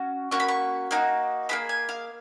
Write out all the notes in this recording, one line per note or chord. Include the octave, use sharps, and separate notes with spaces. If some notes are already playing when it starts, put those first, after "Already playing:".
Already playing: C#4 F#4
A#3 C#4 F#4 C#6
B5
C#6
A#3 D#4 F#4
A#3 F4 G#4 B5
G#5
F5